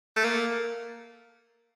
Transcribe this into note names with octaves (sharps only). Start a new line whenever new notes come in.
A3
A#3